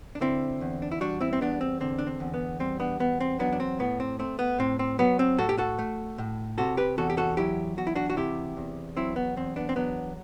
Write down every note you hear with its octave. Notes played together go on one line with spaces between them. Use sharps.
D4
D3 C4 E4
E2
D4
E4
G3 D4 F#4
C4 E4
C4
E2 B3 D4
C4
D3 C4
D4
C4
E2
B3
G3 C4
B3 D4
E2 B3
C4
F#3 B3 D4
D4
C4
A2 B3
C4
A3 C4
B3
A2 C4
C4
F#3 B3
C4
A2 F#4 A4
G4
F#4 A4
A3
A2
C3 F#4 A4
G4 B4
E2 F#4 A4
G4
F#4 A4
F#3 E4 G4
E2 F#4
E4
D4 F#4
F#4
C3 E4 G4
E2
F#3 C4 E4
B3
E2 C4
B3 D4
C4
F#3 B3 D4